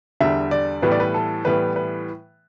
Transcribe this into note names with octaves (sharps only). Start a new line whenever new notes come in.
E2 D3 G3 E5
D5
A2 E3 G3 B3 B4
D5
B4
A4
A2 E3 G3 B3 B4
B4